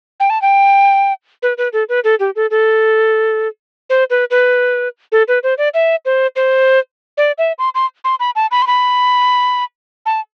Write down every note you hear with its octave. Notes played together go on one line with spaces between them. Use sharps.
G5
A5
G5
B4
B4
A4
B4
A4
G4
A4
A4
C5
B4
B4
A4
B4
C5
D5
E5
C5
C5
D5
E5
C6
C6
C6
B5
A5
B5
C6
B5
A5